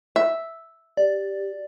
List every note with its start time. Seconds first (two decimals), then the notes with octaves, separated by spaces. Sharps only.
0.16 E5
0.97 G4 D5